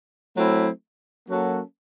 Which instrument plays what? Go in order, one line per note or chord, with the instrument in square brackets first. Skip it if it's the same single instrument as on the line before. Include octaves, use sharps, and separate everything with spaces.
[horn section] F#3 A3 C4 E4
F#3 A#3 C#4 F#4 A4